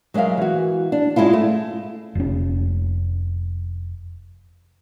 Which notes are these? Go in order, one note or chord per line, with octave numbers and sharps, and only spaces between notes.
F#3 G#3 A#4 E5 F5
E3 F#4
D4
G#2 G#3 C#4 E4 F4
A3
F1 C#4